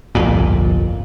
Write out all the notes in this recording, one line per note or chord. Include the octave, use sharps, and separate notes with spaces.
G1 C2 F2 A#2